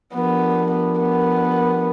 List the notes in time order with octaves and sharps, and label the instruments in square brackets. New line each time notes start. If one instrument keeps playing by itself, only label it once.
[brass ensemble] F3 A3 D4 G4 A#4 [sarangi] B3
[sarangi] B3
B3